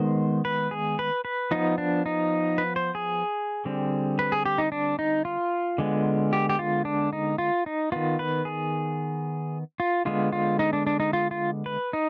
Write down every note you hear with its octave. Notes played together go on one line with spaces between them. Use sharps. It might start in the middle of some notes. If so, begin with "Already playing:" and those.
Already playing: D#3 G#3 B3 C5
B4
G#4
B4
B4
F3 B3 D#4
D4
D#4
B4
C5
G#4
D3 G3 C4
B4
G#4
G4
D#4
D4
D#4
F4
D3 G#3 B3
G4
G4
F4
D4
D#4
F4
D#4
D#3 B3 F4
B4
G#4
F4
D3 G#3 B3 F4
F4
D#4
D4
D4
D#4
F4
F4
B4
D#4